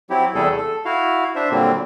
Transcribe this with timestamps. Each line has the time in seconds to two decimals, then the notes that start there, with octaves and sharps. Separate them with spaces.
0.10 F#3 C4 E4 G4
0.35 E2 C3 G3 A3 G#4 A4
0.57 A4
0.85 E4 F#4 F5
1.35 D4 C5 E5
1.51 A#2 D3 F#3 G3 A#3 C4